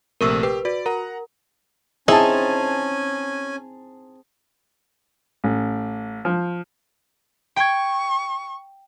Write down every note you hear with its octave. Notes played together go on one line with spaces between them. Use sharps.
A#1 C3 A3 A#4 C#6 E6
G4 B4
F#4 D5
A#4 F#5 A#5
C4 C#4 D#4 E4 G#4 G#5 A5
A1
F3
G5 C#6 G#6